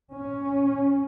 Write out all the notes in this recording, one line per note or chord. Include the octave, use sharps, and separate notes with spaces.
C#4